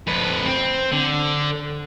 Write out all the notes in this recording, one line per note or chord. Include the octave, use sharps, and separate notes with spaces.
F2 B4
C4
D3